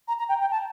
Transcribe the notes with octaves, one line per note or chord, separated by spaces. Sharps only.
A#5
A#5
G5
G5
A5